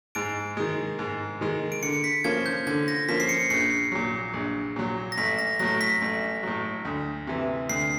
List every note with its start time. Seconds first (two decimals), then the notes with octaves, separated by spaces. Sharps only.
0.15 G#2 D7
0.57 D#3 G#3
0.99 G#2
1.41 D#3 G#3
1.72 D7
1.83 D3 C#7
2.04 B6
2.24 F3 A#3 C#4 G#6
2.46 G6
2.67 D3 G#6
2.88 A#6
3.09 F3 A#3 C#4 B6
3.20 C7
3.29 C#7
3.50 A#1 C7
3.92 A#2 F#3
4.34 A#1
4.76 A#2 F#3
5.12 A#6
5.17 A1 B6
5.39 A#6
5.59 A2 F#3 A#6
5.81 B6
6.02 A1
6.43 A2 F#3
6.85 D2
7.27 C3 E3
7.69 D2 C7